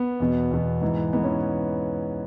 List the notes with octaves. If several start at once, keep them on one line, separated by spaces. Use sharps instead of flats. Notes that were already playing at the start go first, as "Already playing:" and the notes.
Already playing: B3
E2 B2
E2 B2
G#2 E3
G#2 E3 B3
C#4